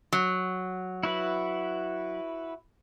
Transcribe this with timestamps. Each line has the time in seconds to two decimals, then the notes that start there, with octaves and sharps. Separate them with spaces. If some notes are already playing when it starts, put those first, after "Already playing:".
0.12 F#3
1.03 E4 F#4 B4